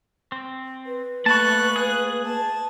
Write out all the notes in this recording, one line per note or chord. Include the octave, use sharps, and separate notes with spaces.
C4
B4
A3 A#3 A5 B5 C#6 F#6
G#4
A5